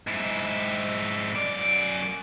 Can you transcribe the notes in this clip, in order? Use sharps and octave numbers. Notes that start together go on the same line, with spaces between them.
G#2 E4
F#2 D5